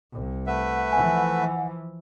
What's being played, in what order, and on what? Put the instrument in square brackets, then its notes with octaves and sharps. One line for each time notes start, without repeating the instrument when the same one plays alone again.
[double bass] C2
[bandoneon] A3 B4 E5 [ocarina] F#5
[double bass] E3 F3 [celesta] G#5